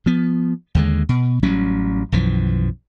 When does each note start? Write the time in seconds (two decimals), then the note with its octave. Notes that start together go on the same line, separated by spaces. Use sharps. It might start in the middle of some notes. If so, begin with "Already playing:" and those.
0.06 F3 B3
0.75 D#2 D3 G#3
1.09 B2
1.43 A1 F#3 G3 C#4
2.12 B1 F#2 E3 F3